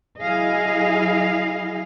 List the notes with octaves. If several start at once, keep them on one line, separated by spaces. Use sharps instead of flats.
F#3 E4 G#4 D#5 F5